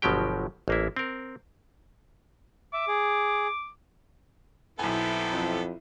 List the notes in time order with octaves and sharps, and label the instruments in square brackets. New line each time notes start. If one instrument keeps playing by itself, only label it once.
[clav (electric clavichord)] G1 B2 F3 F#3 G4 G5
A1 A#3 E4
C4 A#4
[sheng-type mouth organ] E5 [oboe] D6
[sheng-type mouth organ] G#4
[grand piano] B1 G#5 [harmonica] B3 C4 A4 [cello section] E4
[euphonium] F2